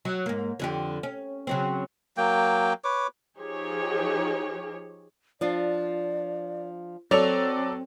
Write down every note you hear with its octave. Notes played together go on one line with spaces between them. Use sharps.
F#3
G#2 A#3
F2 D3 G4
C#4
C#3 F#3 C4
F#3 A#3 G5
B4 C#5 D6
F3 D#4 G4 G#4 C#5
F3 D4 F4 D5
F#3 C4 A4 C#5 D5 F7